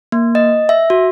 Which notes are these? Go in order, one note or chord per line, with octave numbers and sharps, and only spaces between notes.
A#3
D#5
E5
F#4